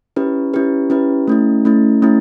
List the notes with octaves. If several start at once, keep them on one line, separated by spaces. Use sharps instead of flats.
C#4 E4 G4 B4
C#4 E4 G4 B4
C#4 E4 G4 B4
A3 C#4 E4
A3 C#4 E4
A3 C#4 E4